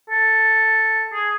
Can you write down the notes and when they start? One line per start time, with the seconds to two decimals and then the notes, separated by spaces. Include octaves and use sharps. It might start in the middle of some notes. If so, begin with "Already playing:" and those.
0.10 A4
1.14 G#4